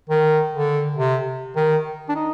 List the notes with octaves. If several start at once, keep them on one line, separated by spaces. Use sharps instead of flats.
D#3
D3
C3
D#3
D4
D#4